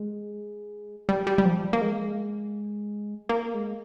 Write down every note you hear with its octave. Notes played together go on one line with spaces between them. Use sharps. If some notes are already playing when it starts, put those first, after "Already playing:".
Already playing: G#3
G3
G3
G3
F3
G3
A#3
G#3
A#3
G#3